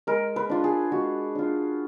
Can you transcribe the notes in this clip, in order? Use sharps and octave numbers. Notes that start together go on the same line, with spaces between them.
G#3 A#4
B4
D4 F4
G#4
G#3 F#4
D4 F4